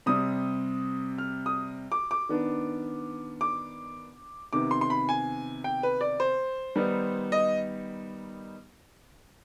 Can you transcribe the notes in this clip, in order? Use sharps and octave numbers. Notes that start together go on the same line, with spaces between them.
C3 G3 C4 D#6
F6
D#6
D6
D6
D#3 B3 D4
D6
C3 D#3 B3 D6
C6
C6
B5
G#5
G5
B4
D5
C5
D#3 G3 B3 D#4
D#5